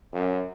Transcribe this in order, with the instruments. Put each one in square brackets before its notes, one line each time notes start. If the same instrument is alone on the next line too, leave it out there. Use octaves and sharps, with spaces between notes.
[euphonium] F#2